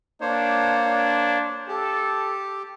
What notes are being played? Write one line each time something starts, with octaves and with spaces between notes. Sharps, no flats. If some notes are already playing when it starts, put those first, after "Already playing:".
A#3 D4 C5 C#5
D4
G4 A4